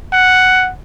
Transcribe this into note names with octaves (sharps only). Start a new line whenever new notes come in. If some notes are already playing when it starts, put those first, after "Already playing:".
F#5